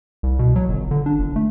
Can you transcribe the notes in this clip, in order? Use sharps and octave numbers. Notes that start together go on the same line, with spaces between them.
C2
B2
F#3
G1
D3
D4
G1
A3